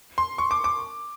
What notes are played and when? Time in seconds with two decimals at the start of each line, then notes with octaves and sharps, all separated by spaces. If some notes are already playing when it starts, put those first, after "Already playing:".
0.18 C6
0.38 C#6
0.51 D6
0.64 D6